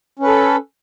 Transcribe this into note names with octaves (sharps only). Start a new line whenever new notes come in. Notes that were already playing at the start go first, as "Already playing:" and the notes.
C#4 A4 B4